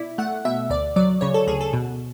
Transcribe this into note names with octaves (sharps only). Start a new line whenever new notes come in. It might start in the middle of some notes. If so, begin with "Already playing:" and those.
Already playing: B2 E4 D5
A3 F#5
B2 E5
D2 D5
F#3 D5
C#3 C#5
A4
D2 G#4
A4
B2